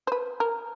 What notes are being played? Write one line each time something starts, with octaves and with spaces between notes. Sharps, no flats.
C5
B4
A#4